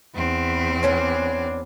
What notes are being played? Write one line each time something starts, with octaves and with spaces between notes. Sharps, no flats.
E2 C4
B3 C#4 D4